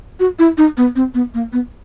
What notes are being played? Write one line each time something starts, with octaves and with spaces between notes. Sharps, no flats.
F#4
E4
D#4
B3
C4
B3
A#3
B3